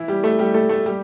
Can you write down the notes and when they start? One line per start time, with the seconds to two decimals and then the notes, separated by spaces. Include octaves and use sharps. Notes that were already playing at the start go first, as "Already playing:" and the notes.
Already playing: E3 E4
0.08 G3 G4
0.23 A3 A4
0.39 G3 G4
0.54 A3 A4
0.69 A3 A4
0.86 G3 G4